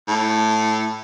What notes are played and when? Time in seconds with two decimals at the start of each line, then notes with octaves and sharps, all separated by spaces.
0.08 A2